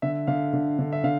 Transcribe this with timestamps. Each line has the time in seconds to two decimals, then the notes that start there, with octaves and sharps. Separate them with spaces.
0.02 D3 E5
0.27 D3 F5
0.53 D3
0.79 D3
0.92 E5
1.04 D3 F5